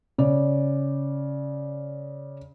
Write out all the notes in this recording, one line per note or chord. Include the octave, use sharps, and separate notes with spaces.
C#3 D5